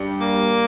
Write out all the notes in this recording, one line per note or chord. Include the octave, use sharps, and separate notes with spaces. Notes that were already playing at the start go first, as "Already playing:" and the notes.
Already playing: G2 G3
A#3